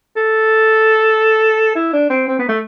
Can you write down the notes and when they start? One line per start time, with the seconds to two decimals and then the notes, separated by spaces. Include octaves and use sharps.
0.17 A4
1.75 E4
1.93 D4
2.10 C4
2.28 C4
2.39 B3
2.49 A3